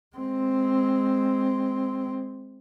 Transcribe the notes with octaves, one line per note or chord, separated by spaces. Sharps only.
G#3 C4